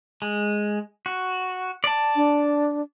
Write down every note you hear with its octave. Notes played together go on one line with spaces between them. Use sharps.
G#3
F#4
D5 A5
D4